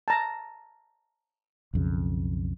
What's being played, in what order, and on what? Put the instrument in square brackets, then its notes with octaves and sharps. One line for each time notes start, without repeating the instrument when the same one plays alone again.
[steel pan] A5 A#5
[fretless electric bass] B1 F2 C#3